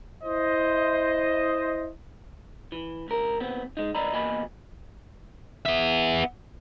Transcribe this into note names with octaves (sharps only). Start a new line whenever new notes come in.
E4 C5 D#5
E3
C#2 A#4
D#2 B3 C4
G#3 D#4
A2 D#3 D5 D#5 A#5 B5
E2 B2 A#3 D#5 G#5 B5
B3 E5